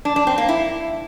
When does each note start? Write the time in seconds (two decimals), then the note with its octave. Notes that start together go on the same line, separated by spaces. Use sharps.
0.05 D4
0.16 D4
0.27 C4
0.38 A#3
0.49 E4